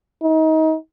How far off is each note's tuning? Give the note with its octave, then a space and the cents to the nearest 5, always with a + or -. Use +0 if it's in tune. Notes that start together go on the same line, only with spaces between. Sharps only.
D#4 +30